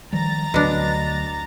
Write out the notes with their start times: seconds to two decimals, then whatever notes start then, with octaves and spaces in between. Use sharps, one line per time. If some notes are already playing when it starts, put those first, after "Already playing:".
0.13 D#3 F3 G3 A#5 A6
0.54 D2 B2 F#3 D4